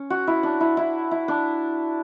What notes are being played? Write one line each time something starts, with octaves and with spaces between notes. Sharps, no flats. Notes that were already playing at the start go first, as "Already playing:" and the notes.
Already playing: C#4
F#4
E4
D4
E4
E4
E4
D4